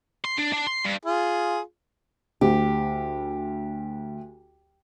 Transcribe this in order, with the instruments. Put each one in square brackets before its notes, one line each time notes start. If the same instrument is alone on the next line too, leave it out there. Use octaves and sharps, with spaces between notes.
[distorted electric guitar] C6
D4
D4
C6
G2
[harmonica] F4 G#4
[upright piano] D2 [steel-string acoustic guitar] G4